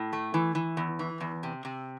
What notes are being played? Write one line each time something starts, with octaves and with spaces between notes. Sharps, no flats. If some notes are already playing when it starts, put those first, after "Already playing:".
Already playing: A2
A3
E3
E3
E2
E3
E2
C3
C3